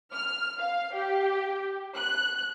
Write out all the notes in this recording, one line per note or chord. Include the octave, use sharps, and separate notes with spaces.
F6
F5
G4
F#6